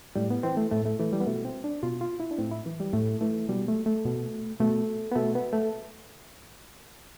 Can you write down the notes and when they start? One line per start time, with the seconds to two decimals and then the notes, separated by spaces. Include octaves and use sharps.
0.15 A2 G3
0.30 B3
0.43 E3 C4
0.57 A3
0.71 A2 A3
0.85 A3
0.99 E3 A3
1.12 G3
1.20 B3
1.26 B2 A3
1.45 C4
1.64 D4
1.83 B2 F4
2.01 F4
2.20 E4
2.31 D4
2.38 A2 C4
2.51 E4
2.66 E3
2.80 G3
2.93 A2 A3
3.21 E3 A3
3.49 B2 G3
3.68 A3
3.86 A3
4.05 B2
4.60 B2 A3
5.11 B3
5.15 B2 A3
5.35 B3
5.53 A3